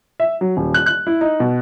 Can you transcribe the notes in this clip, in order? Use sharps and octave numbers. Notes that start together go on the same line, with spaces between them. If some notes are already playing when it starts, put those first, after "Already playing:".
E5
F#3
D#1
F#6
F#6
E4
D#4
B2